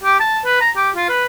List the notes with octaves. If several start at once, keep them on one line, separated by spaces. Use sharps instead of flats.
G4
A5
B4
A#5
G4
F4
B4